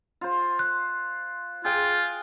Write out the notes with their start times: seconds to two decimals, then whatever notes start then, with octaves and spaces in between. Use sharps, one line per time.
0.21 F4 C5
0.59 F#6
1.65 F4 G#4 G5